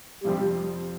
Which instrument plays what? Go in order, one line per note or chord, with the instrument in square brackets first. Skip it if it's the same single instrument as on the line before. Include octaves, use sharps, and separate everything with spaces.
[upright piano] F2 C3 F3 C4 [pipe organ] G3